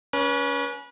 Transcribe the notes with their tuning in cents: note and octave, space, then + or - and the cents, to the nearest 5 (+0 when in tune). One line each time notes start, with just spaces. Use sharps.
C#4 +25 B4 -30